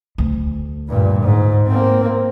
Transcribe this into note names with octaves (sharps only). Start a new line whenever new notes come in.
D2
G2 A#2
G#2
A#3 C4